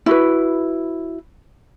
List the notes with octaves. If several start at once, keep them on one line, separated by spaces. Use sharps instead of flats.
E4 F#4 B4